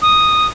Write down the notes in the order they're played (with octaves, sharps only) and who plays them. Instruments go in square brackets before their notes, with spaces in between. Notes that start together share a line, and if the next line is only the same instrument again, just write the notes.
[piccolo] D#6